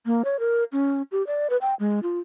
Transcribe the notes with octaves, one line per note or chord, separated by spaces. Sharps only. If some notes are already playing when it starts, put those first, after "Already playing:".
A#3
C#5
A#4
C#4
G4
D5
B4
G5
G#3
F4